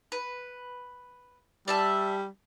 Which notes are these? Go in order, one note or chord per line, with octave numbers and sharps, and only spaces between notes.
B4
G3 D5 E5 A5